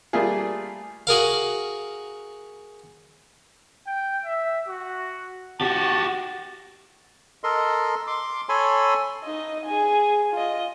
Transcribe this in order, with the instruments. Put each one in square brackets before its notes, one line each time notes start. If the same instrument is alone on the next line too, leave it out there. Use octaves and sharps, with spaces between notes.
[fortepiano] G3 A3 A#3 F4 G#4
[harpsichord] F#4 G#4 A#4 F5
[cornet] G5
E5
F#4
[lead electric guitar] F#4 G4 [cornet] A5
[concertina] A4 A#4 D#5 C6
C6 D6
A4 C#5 G#5 B5 C6
[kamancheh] D#4 D#5
G#4 G#5
F4 D#5